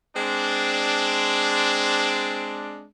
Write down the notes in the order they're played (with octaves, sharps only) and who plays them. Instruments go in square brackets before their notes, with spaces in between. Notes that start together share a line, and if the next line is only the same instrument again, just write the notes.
[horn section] G#3 C4 D4